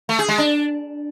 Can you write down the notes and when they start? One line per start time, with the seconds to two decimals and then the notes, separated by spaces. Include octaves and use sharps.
0.09 A3
0.19 G#4
0.28 G#3
0.38 D4